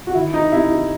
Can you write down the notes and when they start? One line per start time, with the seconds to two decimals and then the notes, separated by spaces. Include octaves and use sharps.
0.07 F#4
0.14 D#3 E4
0.34 D#4
0.52 C3 E4
0.71 D#4